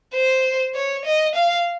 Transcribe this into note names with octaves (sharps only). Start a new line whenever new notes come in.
C5
C#5
D#5
F5